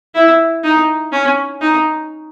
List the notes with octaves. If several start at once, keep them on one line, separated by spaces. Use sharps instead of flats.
E4
D#4
C#4
D#4